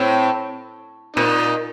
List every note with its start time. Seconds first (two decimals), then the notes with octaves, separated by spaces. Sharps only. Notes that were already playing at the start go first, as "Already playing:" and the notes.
Already playing: A2 C4
1.16 A#2 C4 D#4